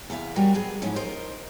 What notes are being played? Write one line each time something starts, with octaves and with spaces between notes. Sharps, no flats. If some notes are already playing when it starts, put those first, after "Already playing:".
E2 C3 E5 F5
G3 F#4 G#4 A#4 C#5
F#3 B3 G#4
G#2 F3 F#3 C#4 E4
A#4 C5 D#5